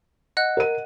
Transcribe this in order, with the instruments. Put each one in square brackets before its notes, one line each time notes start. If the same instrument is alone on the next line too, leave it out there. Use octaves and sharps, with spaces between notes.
[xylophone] D#5 F#5 F#6
[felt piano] A#4 D#7